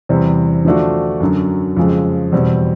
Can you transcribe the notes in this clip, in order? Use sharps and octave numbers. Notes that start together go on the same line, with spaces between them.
E2 C3 E3 G3 C4
D3 F3 A3 D4 F#4
F#2 D3 F#3
F2 C#3 F3 G#3
E2 B2 G3 C4